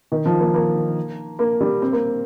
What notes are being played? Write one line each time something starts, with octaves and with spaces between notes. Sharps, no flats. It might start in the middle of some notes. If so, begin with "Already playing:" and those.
D#3
F3
A#3
A#3
A#3
G3
C4
A#3